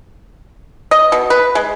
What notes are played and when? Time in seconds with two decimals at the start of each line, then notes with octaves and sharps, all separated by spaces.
0.91 D#5
1.12 B2
1.30 B4
1.55 G#3